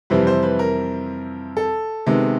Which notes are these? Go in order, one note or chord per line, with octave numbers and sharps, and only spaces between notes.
F2 C3 E3 G3 C4 B4
C5
B4
A#4
A4
C3 D#3 G#3 B3